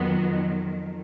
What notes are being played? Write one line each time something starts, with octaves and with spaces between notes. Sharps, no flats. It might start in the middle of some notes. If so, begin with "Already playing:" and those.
Already playing: F2 D#3 F#3 B3